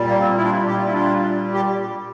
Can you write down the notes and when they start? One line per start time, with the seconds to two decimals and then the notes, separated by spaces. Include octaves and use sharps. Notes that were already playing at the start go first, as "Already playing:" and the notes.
Already playing: A#2 G3
0.08 A#3
0.20 C4
0.37 E4
0.43 D4 F4
0.67 A#2 G3 G4
0.76 F4
0.85 E4
0.92 D4 F4
1.54 G4